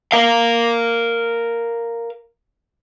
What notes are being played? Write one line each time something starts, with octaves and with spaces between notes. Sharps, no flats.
A#4 F5